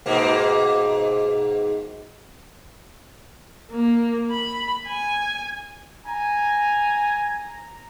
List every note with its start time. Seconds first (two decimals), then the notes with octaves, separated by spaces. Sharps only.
0.06 G#2 B2 A#3
3.72 A#3
4.31 B5
4.88 G#5
6.06 G#5 A#5